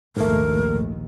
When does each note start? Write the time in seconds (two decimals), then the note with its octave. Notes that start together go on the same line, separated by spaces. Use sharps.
0.17 A#1 D#2 G#2 D#3 A3 A#4